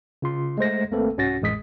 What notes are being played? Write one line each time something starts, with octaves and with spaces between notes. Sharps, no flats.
C#3 F4 C6
G#3 A3 C5 A#6
G#1 A3 A#3 C4 A4 B4
C2 G#2 C#4 F#4 A6 A#6
A1 F2 G#3 D#6 B6